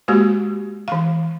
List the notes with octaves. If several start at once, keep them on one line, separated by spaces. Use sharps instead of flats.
G#3 A#3 F#4 G4
E3 F5